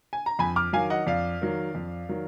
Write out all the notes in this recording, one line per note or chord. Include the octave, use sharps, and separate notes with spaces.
G#5
A#5
F2 G#5 B5
D6 F6
D#3 F#3 F5 G#5
D#5 F#5
F2 D5 F5
D#3 F#3
F2
D#3 F#3